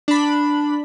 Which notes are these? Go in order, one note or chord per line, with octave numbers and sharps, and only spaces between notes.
D4 B5